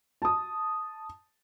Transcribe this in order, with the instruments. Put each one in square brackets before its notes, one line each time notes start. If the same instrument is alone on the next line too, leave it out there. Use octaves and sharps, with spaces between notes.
[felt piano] A5 D#6